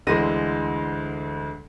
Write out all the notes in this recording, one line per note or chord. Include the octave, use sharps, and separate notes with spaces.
D2 D3 E3 G#3 A#6 D#7